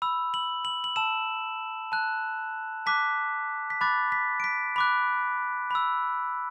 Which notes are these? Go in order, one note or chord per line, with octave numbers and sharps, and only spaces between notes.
B5 E6
F#7
F#7
F#7
A5 E6 E7
A5 F#6
A5 D6 F#6 B6
B6
B5 D6 F#6 A6
B6
D7
B6
B5 D6 F#6
B5 E6